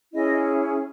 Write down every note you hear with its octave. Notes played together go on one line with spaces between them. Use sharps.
C#4 E4 G#4 D#5